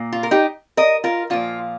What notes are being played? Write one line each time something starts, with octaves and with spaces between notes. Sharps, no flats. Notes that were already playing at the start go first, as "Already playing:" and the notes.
Already playing: A#2 A#3
F4
A#4
D#4 G4
A#4 D#5
F4 A#4
A#2 F3 A#3 F4